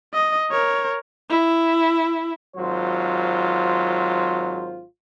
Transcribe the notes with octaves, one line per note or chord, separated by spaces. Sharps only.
D#5
A#4 C#5
E4
G#1 F#3 F4 C5